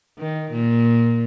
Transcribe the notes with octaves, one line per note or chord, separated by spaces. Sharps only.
D#3
A#2